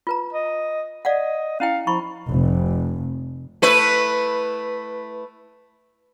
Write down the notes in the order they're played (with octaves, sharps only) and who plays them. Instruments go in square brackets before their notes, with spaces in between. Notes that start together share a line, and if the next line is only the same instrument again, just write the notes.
[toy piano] F4 B4 A#5
[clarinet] D#5
[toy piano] D5 F5 F#5 [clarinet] D#5
[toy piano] C#4 E4 G5 [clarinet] F5
[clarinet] F3 [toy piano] E4 B5 C#6
[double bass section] F1
[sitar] A3 E4 B4